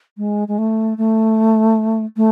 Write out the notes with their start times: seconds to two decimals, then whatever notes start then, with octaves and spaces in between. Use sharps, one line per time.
0.18 G#3
0.48 G#3
0.58 A3
0.98 A3
2.17 A3